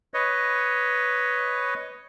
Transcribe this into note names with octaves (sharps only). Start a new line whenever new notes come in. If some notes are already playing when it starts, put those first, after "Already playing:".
B4 C#5 D#5